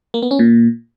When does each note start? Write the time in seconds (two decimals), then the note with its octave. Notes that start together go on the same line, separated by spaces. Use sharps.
0.14 A#3
0.22 B3
0.31 C#4
0.39 A#2